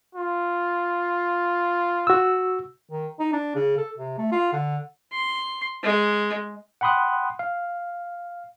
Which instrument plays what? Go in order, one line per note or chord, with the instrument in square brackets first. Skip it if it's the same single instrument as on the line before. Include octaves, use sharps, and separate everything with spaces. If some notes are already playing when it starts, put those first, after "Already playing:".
[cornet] F4
[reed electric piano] F#4 E6
[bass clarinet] D#3
D#4
D4
C#3
A4
C3
A3
F4
D3
[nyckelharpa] C6
G#3
[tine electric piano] F#5 G5 B5 C6 D#6 F#6
F5